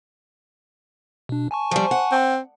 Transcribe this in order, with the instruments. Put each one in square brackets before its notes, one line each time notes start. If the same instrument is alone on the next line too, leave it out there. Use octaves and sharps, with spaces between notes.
[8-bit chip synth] B2 D4
G#5 A5 C#6
[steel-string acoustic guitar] F3 G3 [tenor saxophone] C5
[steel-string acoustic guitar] F#5
[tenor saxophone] C4